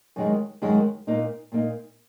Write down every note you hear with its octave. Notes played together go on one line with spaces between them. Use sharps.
F#2 D#3 G#3
F#2 D#3 G#3
A#2 A#3 D#4
A#2 A#3 D#4